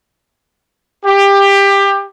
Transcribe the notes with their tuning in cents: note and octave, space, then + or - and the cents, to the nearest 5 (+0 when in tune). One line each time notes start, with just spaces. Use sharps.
G4 +20